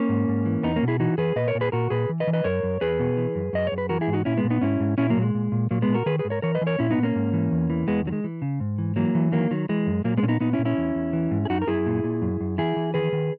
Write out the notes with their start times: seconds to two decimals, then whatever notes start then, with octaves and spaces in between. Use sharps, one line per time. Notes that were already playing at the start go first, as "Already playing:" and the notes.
Already playing: A#3 C#4
0.09 G#2
0.28 G#2
0.45 E3
0.63 E2 B3 D#4
0.76 A#3 C#4
0.83 B2
0.88 E4 G#4
1.00 E3 D#4 F#4
1.18 E3 G#4 B4
1.36 A#2 B4 D#5
1.48 A#4 C#5
1.55 A#2
1.61 G#4 B4
1.72 A#2 F#4 A#4
1.90 A#2 G#4 B4
2.09 E3
2.20 B4 D#5
2.27 E3
2.33 B4 D#5
2.44 F#2 A#4 C#5
2.63 F#2
2.81 E2 G#4 B4
3.00 B2
3.17 E3
3.35 F#2
3.53 F#2 D#5
3.67 F#2 C#5
3.78 B4
3.89 E3 F#4 A#4
4.01 E4 G#4
4.07 G#2
4.13 D#4 F#4
4.25 A#2 C#4 E4
4.37 G#3 B3
4.44 A#2
4.50 B3 D#4
4.61 G#2 C#4 E4
4.80 G#2
4.98 A#2 C#4 E4
5.10 F#3 A#3
5.17 A#2
5.22 G#3
5.34 A#2
5.52 A#2
5.71 A#2 F#3 A#3
5.82 G#3 B3
5.88 A#2
5.94 F#4 A#4
6.06 D#3 G#4 B4
6.19 G#4 B4
6.25 G#2
6.30 A#4 C#5
6.42 E3 A#4 C#5
6.55 B4 D#5
6.61 E3
6.67 A#4 C#5
6.79 A#2 C#4 E4
6.91 B3 D#4
6.98 A#2
7.03 A#3 C#4
7.15 G#2
7.33 E3
7.52 E2
7.70 E3
7.87 E2 G#3 B3
8.06 D#3 F#3
8.12 G#3
8.24 E3
8.42 C#3
8.60 G#2
8.78 E3
8.96 E3 F#3 A#3
9.15 E3
9.32 D#3 F#3 A#3
9.51 D#3 F#3
9.69 E3 G#3
9.87 F#2
10.04 A#2 F#3 A#3
10.17 G#3 B3
10.23 A#2 C#4
10.28 B3 D#4
10.40 A#2 B3 D#4
10.53 C#4 E4
10.59 A#2
10.65 C#4 E4
10.78 E2
10.95 E2
11.13 E3
11.31 G#2
11.45 G#4
11.50 F#2 D#4 F#4
11.62 A#4
11.67 F#2 E4 G#4
11.86 A#2
12.04 A#2
12.22 F#2
12.40 F#2
12.58 E3 E4 G#4
12.76 E3
12.94 D#3 G#4 B4
13.13 D#3